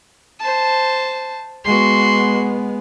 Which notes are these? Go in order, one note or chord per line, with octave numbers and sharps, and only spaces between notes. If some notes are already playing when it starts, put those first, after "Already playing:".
C5 A5
G#3 B3 F#4 C6